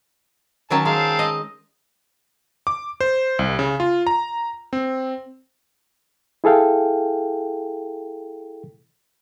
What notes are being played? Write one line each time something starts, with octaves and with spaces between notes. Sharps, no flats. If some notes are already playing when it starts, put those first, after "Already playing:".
D#3 F#3 C#4 A5
G#3 C4 F5 A5
D#5
D6
C5
C2
C#3
F4
A#5
C4
E4 G#4 A4 F5 G5